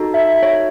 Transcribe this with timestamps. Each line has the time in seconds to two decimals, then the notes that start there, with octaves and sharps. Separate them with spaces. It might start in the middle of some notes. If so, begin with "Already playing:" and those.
Already playing: D#4 F#4 A4
0.14 E5
0.43 C#5